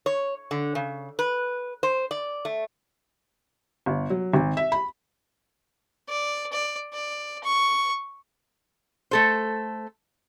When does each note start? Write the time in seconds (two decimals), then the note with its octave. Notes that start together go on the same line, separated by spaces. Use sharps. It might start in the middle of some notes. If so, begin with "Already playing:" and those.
0.06 C#5
0.51 D3
0.75 C#3
1.19 B4
1.83 C5
2.11 D5
2.45 A3
3.86 G1
4.10 F#3
4.34 G#1
4.57 E5
4.72 B5
6.08 D5
6.52 D5
6.93 D5
7.43 C#6
9.11 A3 A4 C5